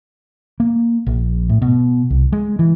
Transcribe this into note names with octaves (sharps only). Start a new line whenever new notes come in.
A#3
A#1
A2
B2
C2
G#3
E3